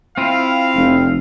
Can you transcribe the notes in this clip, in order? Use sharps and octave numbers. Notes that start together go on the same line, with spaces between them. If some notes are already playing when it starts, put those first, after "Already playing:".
C4 E4 F4 F5
F1